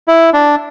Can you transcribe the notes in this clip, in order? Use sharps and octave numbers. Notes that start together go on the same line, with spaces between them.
E4
D4